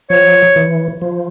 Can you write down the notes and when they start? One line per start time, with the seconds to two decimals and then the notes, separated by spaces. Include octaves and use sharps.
0.10 F3 C#5
0.56 E3
1.02 F3